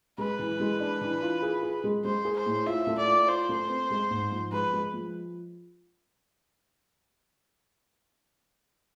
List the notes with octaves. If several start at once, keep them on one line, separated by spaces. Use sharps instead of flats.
G#3 B4
E3
G#3
D4
E3
F4
G#4
G#4
G#3
G#3 C5
G#4
C5
A2
F4 E5
A3
D5
F4
F4 C5
A3
C4
G#3
G#2
F3
G#3 B4
G#3
F3